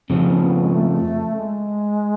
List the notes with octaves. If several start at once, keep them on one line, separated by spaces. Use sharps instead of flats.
F2 C#3 F3 C#4
B3
G#3
A3
G#3